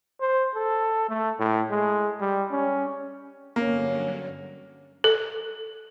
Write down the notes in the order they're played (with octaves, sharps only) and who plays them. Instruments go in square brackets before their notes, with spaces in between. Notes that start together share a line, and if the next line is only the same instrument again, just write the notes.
[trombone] C5
A4
A3
A2
G#3
G3
C#4
[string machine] G2 D3 F#3 [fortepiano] A#3 [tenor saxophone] C#4
[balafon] A4